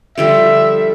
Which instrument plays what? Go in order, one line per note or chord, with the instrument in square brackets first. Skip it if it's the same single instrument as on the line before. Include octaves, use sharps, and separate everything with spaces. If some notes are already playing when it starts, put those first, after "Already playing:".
[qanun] D3 F3 G3 [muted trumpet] E5